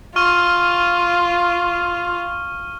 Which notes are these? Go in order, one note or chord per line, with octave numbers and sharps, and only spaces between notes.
F4 C#6 F6 D#7